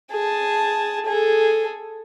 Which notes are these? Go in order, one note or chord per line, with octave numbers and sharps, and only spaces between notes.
G#4 A5
G#4 A4